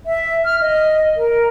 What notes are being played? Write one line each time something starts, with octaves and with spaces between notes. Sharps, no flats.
E5
F6
D#5
A#4